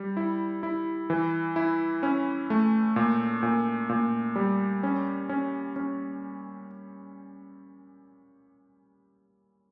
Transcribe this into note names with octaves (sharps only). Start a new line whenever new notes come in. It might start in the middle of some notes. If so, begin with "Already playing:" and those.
Already playing: G3
E4
E4
E3
E4
C#4
A3
A#2
A#2
A#2
G3
C#4
C#4
C#4